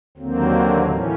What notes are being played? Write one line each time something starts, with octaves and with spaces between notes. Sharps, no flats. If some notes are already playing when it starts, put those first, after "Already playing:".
D#2 D3 F#3 A#3 C4
A2 E3 A3 C#4